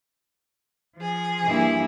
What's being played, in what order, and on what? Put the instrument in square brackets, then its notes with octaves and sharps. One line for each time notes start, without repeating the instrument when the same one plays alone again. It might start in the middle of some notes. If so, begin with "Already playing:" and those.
[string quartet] F3 G#4
[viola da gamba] G2 A#3 E4